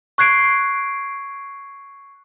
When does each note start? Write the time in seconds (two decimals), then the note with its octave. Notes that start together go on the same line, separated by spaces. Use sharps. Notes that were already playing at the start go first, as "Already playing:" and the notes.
0.18 C#6 F#6 G#6 C7 D7